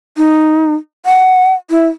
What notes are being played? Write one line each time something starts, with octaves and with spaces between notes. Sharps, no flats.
D#4
F#5
E4